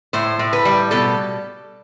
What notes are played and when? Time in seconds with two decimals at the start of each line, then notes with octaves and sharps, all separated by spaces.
0.13 A2 C5
0.39 A2
0.53 B4
0.65 G3
0.91 B2 A4